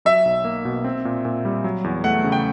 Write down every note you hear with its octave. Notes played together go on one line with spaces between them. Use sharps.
F#3 E5
B1
A#3
B2
C4
A#2
A#2
G3
F#3
E2
A3 F#5
C#3
G5